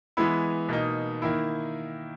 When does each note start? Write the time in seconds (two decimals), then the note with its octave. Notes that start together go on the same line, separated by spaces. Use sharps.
0.17 E3 G#3 B3 E4
0.69 B2 A#3 D#4
1.22 D#3 A#3 E4